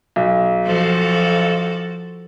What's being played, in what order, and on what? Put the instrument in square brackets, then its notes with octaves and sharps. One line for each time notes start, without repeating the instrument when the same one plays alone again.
[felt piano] B1
[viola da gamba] F3 F#4 A4